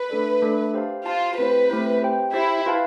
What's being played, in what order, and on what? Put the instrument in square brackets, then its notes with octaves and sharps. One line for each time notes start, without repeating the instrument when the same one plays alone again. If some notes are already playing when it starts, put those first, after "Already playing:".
Already playing: [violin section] B4
[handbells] A3 D4 A4 D5
A3 D4 A4 D5
G4 C5 F5 A5
[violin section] F4 [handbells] G4 C5 F5 A5
[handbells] A3 C4 E4 G4 C5 [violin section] B4
[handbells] A3 C4 E4 G4 C5
G4 C5 G5
[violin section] E4 [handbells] G4 C5 G5
[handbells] F4 B4 F5 A5